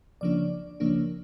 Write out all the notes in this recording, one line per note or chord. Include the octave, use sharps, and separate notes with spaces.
C#2 C#3 F3 A#3 D4 D5
C#2 C#3 F3 A#3 D4